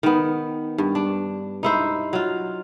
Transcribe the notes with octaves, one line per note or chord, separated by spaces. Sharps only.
D#3 B3
G2
D4
D#4 E4 C5
F#3 F4